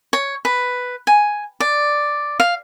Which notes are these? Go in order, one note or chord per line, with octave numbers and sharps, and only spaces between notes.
C#5
B4
G#5
D5
F5